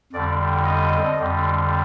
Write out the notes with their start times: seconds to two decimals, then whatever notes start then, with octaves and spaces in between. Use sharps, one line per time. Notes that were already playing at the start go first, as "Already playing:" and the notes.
0.13 F2 D3 G3 D5
0.65 D#5
1.17 F2 D3 G3